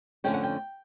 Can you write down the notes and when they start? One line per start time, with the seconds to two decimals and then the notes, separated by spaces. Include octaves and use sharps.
0.24 F2 D3 F3 A3 C#4 G5
0.34 F#5
0.43 G5